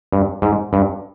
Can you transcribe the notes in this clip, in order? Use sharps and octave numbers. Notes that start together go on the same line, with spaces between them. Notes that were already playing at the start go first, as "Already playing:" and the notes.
G2
G#2
G2